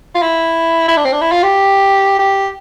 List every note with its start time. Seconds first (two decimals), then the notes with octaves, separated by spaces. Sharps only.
0.15 F4
0.22 E4
0.88 E4
0.97 D4
1.05 C4
1.13 D4
1.21 E4
1.32 F4
1.43 G4
2.19 G4